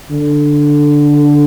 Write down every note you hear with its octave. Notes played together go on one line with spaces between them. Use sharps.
D3